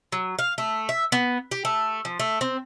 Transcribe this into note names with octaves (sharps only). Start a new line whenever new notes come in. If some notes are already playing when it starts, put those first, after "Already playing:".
F#3
F5
A3
E5
B3
G4
A3
F3
A3
C4